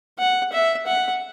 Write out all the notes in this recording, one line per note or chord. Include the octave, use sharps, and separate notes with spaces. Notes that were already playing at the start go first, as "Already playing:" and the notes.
F#5
E5
F#5